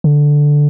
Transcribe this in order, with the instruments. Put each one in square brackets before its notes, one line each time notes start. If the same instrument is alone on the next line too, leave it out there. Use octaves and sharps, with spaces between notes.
[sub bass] D3